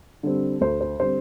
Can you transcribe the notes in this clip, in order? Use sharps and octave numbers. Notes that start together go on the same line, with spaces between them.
D3 G3 C4
D2 C5
C5
D3 G3 C4 C5